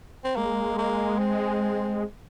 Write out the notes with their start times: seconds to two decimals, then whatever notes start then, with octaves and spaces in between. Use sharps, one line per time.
0.24 C4
0.36 G#3 A#3
0.78 A#3
1.19 C4